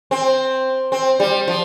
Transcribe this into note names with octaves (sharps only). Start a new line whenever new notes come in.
C4
C4
G3
F3